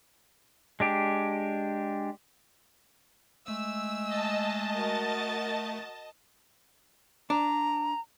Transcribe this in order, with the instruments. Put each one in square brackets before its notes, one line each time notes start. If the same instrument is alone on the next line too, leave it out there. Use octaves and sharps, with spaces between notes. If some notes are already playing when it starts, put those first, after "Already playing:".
[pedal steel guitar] G#3 D4 G4
[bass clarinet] G#3 [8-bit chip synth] A3 [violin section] E6
[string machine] D#5 A5
[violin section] F#4 A#4 A6
[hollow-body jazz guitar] D4 [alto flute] A#5